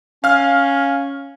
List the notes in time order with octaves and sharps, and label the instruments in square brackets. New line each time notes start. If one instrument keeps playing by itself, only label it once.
[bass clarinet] C#4 [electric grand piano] F5 F6